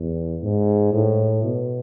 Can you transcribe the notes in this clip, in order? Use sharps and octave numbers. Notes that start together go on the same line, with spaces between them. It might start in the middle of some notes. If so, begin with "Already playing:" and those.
Already playing: E2
G#2
A2
B2